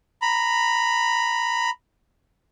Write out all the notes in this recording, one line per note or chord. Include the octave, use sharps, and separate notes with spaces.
A#5 B5